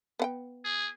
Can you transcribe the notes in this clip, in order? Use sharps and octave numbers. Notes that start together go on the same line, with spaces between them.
B3 F#5 G5
G#4